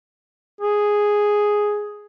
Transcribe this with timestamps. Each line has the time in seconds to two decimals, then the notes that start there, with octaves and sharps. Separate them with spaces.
0.61 G#4